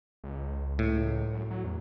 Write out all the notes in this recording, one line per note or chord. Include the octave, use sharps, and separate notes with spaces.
C#2
A2
F#2
F#3
E2